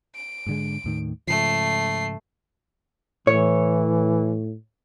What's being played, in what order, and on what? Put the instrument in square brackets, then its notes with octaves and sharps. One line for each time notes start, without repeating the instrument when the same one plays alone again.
[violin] D7
[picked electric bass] G#2 D3 G#3
D#2 A2 D#3
[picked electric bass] G#2 C#3 F3 [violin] A3 C7
[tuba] A2 [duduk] E3 [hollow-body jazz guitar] C#5